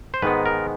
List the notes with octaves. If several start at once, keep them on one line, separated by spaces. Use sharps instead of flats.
C5
G#2 D#3 G#3 B3 B4
A#4